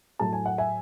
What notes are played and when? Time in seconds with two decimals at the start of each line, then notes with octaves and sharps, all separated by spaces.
0.19 A2 F#3 A5
0.33 G#5
0.46 F#5
0.58 E5 G#5